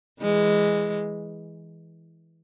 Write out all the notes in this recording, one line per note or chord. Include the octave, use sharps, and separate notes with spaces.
E3 G#3